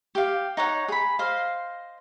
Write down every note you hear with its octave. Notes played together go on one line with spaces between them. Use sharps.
G4 F5
D#4 C#5 F#5
G#4 B5
C5 D#5 F5